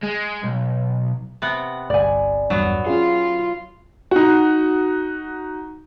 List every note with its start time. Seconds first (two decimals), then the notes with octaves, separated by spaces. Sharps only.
0.03 G#3
0.44 B1
1.42 C3 B3 F#5
1.90 G1 C2 D5 G#5
2.50 A1 E2 G2 F#3 B3
2.86 C#4 F4 G#4
4.11 D#4 F#4